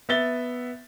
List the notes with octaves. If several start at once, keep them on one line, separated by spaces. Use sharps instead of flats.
B3 E5 A6 G7